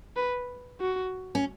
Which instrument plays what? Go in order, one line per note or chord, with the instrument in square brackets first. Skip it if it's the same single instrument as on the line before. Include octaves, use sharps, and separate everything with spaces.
[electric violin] B4
F#4
[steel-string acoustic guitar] C#4